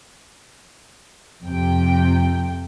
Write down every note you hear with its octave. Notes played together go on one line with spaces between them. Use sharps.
F2 C3 G5